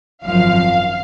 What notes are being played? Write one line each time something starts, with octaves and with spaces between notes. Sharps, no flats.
G#1 F#2 F3 F5